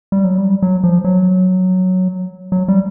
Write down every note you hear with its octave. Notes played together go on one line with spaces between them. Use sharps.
G3
F#3
G3
F#3
F3
F#3
F#3
G3